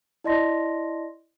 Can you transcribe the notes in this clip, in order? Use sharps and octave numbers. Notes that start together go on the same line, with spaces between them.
E4 D5 D#5 A5 C6 A#6